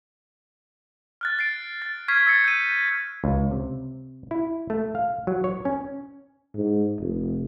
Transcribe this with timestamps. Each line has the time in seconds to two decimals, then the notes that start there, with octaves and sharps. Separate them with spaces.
1.21 F6 F#6 A6
1.39 A6 C7 D7
1.82 A6
2.08 C#6 F6 G#6 B6 C7
2.27 E6 G#6 A6 C7 C#7
2.44 G6 D#7
3.24 C#2
3.51 C3
4.31 E4
4.70 A3
4.95 F5
5.27 F#3
5.44 C#5
5.65 C#4
6.55 G#2
6.99 F1